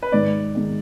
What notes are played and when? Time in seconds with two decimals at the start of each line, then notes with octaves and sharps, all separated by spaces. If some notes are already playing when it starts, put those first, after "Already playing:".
0.03 B4
0.12 G#2 D#3 G#3 D#4 D5
0.55 D#3 G#3 D#4